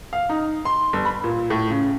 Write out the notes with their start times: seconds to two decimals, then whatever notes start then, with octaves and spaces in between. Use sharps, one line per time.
0.13 F5
0.29 D#4
0.65 C6
0.93 G1
1.05 B5
1.24 A#2
1.50 A2
1.70 C#3